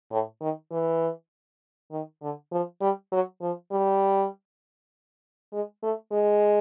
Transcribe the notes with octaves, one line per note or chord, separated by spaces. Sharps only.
A2
D#3
E3
D#3
D3
F3
G3
F#3
F3
G3
G#3
A3
G#3